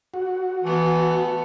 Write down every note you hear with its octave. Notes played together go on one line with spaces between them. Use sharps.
F#4
E3 A3 B3